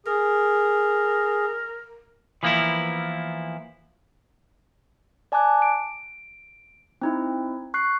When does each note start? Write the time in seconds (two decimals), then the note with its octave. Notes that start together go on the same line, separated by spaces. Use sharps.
0.06 G#4 A#4
2.43 E3 F3 A#3 B3 E4
5.32 D5 G#5 A5 D6 F#6
5.62 D7
7.01 C4 D#4 E4
7.74 C#6 F#6 C7